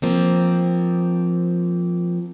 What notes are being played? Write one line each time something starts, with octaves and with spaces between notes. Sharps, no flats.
F3 A#3 C4